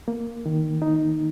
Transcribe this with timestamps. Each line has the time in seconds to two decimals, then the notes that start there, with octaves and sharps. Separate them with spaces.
0.08 A#3
0.46 D#3
0.82 D#4